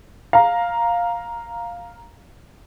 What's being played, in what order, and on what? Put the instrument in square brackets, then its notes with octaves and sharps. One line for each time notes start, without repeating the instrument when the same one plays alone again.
[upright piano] F5 A#5